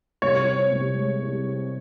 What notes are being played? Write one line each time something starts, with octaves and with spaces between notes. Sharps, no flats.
C2 C#5
C4
C2
G#3
C2
C4